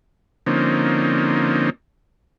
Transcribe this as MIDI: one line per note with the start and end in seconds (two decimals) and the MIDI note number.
0.47 1.70 50
0.47 1.70 53
0.47 1.70 58
0.47 1.70 60
0.47 1.70 61
0.47 1.70 63